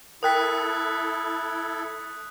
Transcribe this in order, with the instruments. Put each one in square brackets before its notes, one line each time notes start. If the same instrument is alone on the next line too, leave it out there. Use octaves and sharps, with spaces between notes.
[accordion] E4 A4 [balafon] A#4 G5 [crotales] D#6 F#6 B6